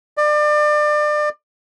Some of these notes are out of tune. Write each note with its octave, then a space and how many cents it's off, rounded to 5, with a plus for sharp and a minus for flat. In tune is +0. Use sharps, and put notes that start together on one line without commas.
D5 +30